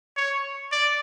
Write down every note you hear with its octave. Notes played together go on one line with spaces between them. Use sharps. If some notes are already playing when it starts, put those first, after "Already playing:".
C#5
D5